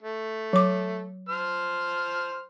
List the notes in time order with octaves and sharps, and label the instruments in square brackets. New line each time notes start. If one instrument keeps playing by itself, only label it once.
[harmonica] A3
[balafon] F#3 D6
[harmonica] C5 F6